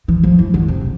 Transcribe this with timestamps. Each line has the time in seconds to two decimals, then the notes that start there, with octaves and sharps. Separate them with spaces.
0.08 E3
0.23 F3
0.39 E3
0.54 D3
0.68 C3